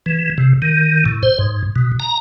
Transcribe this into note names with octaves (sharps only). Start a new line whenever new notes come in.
E3
C3
D#3
A2
C5
G#2
B2
A#5